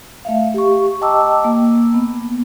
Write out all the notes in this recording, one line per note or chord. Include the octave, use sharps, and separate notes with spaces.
A3 E5 F5
G4 C#6
D#5 G5 A5 A#5 D6 E6
A#3
B3